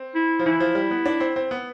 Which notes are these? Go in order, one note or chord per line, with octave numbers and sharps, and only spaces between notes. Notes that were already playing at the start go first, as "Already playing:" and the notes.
Already playing: C4
E4
F3
E3 E4
F3
G3
B3
D4
C4
C4
B3